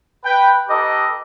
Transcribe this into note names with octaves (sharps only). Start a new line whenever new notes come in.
B4 G5
D#4 G4 A4 B4 D#5 D6